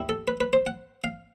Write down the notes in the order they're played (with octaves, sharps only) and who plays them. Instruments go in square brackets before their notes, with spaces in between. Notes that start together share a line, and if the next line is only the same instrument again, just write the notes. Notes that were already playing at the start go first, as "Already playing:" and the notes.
Already playing: [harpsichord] D#2 G3 E4
A4
B4
B4
C5
F#5
F5